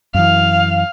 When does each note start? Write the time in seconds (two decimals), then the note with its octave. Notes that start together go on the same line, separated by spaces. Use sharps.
0.14 F#2 E3 F5